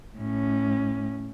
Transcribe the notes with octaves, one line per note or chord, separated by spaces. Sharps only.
A2 C#4